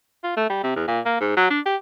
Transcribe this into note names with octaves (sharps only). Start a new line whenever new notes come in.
F4
A3
G3
C3
E2
A#2
A#3
G#2
F#3
D4
G4